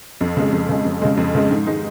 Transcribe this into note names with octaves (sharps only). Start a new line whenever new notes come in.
F2
C#3 G#3
F2
C#3 G#3
F2
C#3 G#3
F2
C#3 G#3
G#2
D#3 G#3 D#4